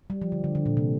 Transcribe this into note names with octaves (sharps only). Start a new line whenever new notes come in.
G3
F3
D3
D3
D3
A#2
C3